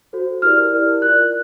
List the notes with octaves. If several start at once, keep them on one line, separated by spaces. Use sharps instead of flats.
F#4 A4 C5
E4 G4 A#4 D5 F6
E4 G4 A#4 D5
F4 A#4 D5 F#6